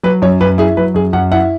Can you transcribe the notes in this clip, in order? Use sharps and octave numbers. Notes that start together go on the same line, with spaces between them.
F#3 B4
F#2 C#5
F#2 B4
E4 G#4
F#3 B4
F#2 G#4
F#2 F#5
E4 F#5